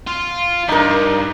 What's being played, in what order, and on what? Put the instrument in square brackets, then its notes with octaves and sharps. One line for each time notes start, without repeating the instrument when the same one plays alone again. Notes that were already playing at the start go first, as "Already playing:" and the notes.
[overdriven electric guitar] F4
[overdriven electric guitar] G2 [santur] D#4 A#4